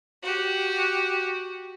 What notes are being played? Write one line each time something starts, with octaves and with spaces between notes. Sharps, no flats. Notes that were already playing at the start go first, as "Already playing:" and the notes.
F#4 G4